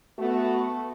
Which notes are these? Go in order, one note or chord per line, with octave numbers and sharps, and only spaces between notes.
A3 B3 F#4